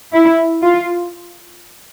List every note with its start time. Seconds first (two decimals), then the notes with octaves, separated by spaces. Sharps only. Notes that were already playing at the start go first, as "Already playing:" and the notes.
0.13 E4
0.62 F4